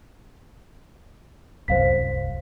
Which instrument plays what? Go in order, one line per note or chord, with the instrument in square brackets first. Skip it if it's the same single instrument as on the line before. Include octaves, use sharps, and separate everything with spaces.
[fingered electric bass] D1 C2 F#2 [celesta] C5 F5 B6